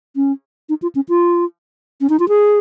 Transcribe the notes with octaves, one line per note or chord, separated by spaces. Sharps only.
C#4
D#4
F4
C#4
F4
C#4
D#4
F4
G#4